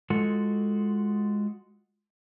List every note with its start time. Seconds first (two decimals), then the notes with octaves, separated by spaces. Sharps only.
0.10 G#3 F4 F#4 A4